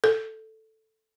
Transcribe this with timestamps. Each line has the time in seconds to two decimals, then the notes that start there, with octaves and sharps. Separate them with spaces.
0.04 A4